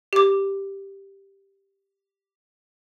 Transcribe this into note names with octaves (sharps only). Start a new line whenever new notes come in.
G4 D6